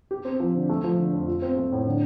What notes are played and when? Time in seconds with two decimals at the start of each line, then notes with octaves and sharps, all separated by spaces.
0.11 G4
0.25 C4
0.40 F3
0.54 D3
0.69 A3
0.84 F3
0.99 D3
1.13 F2
1.28 F4
1.42 C4
1.56 A3
1.72 A2
1.86 D3